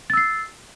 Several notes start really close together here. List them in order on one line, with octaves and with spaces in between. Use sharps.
A6 E6 C7